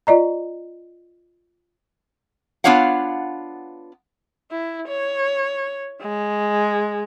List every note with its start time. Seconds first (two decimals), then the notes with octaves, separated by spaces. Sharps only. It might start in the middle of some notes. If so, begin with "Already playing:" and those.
0.07 F4 D5 D#5 A#5
2.64 B3 D4 F4 C#5 F5 F#5
4.51 E4
4.88 C#5
6.02 G#3